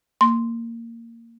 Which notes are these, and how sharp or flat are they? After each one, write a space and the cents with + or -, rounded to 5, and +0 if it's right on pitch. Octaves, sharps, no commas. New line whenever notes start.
A#3 -15 C6 +0